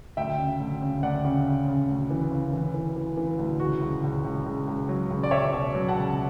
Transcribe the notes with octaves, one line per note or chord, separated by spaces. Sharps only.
D2 E5 G5
C#3
D2
C#3
D2 D5 F#5
C#3
C#3
C#3
D2
E3
C#3
E3
E3
E3
E3
D2
C#2 F#4
C#2
C#2
C#2
C#2
C#2
F#3
C#2
D5
C#2 C#5 E5
B2
F#3
F#5 A5
C#2